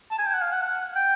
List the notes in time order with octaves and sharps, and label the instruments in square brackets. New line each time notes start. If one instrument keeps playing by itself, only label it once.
[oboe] A5
G#5
G5
F#5
F5
F#5
F#5
G5